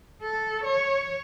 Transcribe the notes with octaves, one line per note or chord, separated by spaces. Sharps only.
A4
C#5